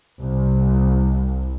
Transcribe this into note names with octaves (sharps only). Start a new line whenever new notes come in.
C2